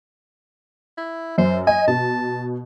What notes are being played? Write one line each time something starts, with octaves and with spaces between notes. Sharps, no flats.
E4
F#2 C5
D#5 G#5
B2 A5